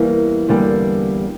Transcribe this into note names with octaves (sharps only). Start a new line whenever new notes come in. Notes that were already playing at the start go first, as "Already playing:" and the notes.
Already playing: E2 E3 G3 A#3
E2 D3 G3 A#3